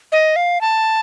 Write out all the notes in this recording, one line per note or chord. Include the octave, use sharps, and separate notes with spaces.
D#5
F5
A5